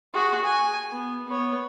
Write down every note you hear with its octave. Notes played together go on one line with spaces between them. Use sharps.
F#4 G#4
G#5
B3
B3 C#5